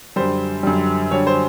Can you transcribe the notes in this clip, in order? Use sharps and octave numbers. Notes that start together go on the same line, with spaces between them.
F#2 D3 G3 C5
F#2 D3 G3
F#2 D3 G3 C#5
C5